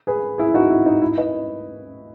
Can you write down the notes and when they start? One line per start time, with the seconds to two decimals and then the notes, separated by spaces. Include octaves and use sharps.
0.07 G#4 B4
0.38 E4 G#4
0.54 D#4 F#4
0.70 E4
0.86 D#4
1.02 E4
1.17 B4 D#5